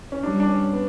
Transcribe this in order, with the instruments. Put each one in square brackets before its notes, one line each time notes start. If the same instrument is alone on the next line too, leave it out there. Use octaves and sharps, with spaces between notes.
[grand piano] C#4
[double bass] G3 [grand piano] D4
[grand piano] D4
C#4
B3